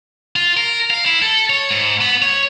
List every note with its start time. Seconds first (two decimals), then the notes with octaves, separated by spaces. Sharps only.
0.36 F4
0.57 A#4
0.91 F5
1.06 E4
1.22 A4
1.50 C#5
1.70 G#2
2.01 B3
2.22 C#5